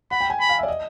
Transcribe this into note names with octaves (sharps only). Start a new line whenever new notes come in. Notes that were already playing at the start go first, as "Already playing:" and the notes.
F#5 B5
G5
G#5
B5
F5
E5
D5
D#5